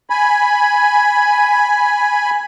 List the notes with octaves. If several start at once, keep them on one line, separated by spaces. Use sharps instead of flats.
G#5 B5